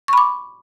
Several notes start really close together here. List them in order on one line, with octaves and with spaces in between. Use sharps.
C#6 B5 D6